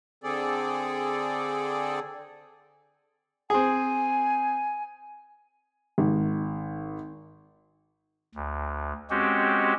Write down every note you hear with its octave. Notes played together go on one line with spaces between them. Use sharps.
D3 C4 G#4 A4 D5
C4 G#4 G#5
G#1
D2
G#3 C4 C#4 F#4 G4